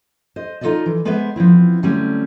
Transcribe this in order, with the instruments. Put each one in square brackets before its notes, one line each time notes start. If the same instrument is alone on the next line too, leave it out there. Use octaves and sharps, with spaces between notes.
[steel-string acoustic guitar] C5 D#5
D#4 F4 F#4 A4 D5 D#5
E3
G#3 B3 B4 C5 D5 E5
F3 B3 C4 E4
D3 F#3 G3 A3 C4 C#4